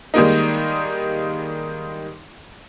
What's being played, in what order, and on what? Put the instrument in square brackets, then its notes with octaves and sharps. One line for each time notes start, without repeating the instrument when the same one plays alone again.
[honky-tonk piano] D#3 G3 G#3 A#3 D#4